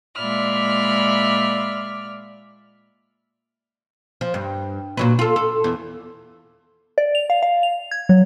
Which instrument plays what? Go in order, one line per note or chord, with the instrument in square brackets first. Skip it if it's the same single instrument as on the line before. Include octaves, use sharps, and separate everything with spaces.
[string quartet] A#2 G#3 D5 E5 B5 F6
[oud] F3
G2
A#2 F#3 B4
F4 A4
A4
E2
[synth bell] D5
F7
F5
F5
F7
G#6
F#3